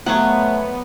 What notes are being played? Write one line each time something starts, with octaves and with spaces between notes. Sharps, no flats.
F#3 A3 B3 C5 C#5 F5 F#5